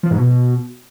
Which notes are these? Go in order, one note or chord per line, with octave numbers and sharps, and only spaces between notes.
F3
G#2
B2